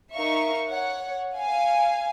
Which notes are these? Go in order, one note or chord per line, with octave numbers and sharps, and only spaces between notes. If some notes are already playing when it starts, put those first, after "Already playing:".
D#4 A#4 E5 F5 C#6
C#5 F#5
F5 G#5